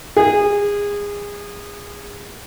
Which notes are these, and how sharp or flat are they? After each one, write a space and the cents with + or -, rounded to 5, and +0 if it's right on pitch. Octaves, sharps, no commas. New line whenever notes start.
G#4 -25